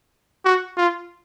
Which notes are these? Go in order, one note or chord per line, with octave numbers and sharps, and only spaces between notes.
F#4
F4